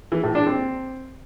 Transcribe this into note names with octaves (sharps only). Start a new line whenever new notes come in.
E3
A2
D4
C4